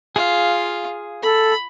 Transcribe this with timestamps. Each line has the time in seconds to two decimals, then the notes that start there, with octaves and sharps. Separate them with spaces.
0.16 F4 G#4 F5
1.23 A4 B5